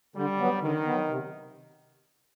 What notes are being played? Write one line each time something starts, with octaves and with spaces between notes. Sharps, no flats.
D3 G3
F#3 B3
D3 D#3
F#3 B3
C3